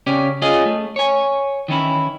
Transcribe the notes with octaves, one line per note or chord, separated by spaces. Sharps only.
C#3 C#4 G4 D5
C#4 F4 G#4 D#5
A3
C#5 G#5
D#3 E3 C#4 E4